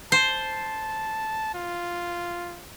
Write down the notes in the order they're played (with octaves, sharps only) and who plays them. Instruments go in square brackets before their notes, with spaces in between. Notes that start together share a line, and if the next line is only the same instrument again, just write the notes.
[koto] C5 [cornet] A5
[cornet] F4